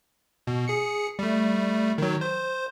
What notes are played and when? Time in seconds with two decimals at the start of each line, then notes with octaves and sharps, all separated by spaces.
0.47 B2
0.68 G#4 C#7
1.19 G3 A3
1.98 D#3 F#3
2.21 C5